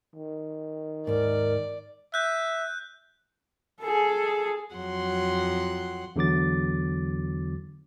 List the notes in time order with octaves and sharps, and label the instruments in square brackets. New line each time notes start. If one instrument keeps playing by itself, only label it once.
[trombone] D#3
[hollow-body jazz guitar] D#2 G#2 [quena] A#4 [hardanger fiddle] D5
[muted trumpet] E5 [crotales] F#6 G6
[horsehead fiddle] G#4 A4
[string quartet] F2 F#3 F#5 C6
[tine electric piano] E2 D3 F#3 D6 A6